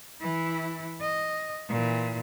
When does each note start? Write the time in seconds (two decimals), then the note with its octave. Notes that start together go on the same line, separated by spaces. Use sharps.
0.21 E3 E4
1.01 D#5
1.69 A#2 E3